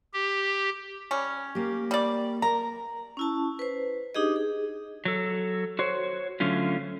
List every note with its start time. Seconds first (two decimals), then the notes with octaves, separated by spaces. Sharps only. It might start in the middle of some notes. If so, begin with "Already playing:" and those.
0.13 G4
1.11 G3 C#4
1.55 A#3 G4
1.91 G3 D5
2.42 A#4 A#5
3.17 C#4 E4 A5
3.59 B4 C5
4.15 D4 D#4 G4 G#4 D#5
4.36 G#4
5.05 F#3 A4
5.79 F#4 C5 C#5
6.40 D3 F#3 A3 C#4 F4